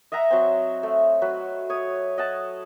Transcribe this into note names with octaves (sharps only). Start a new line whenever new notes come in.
D#5 E5 F#5 A#5
F#3 C4
A3
F#3 B4
C#5 D#6
D#5 F#5 A5